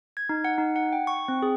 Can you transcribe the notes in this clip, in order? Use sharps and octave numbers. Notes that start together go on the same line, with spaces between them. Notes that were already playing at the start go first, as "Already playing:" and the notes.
G#6
D#4
F#5
D#4
F#5
G5
C#6
C4
G#4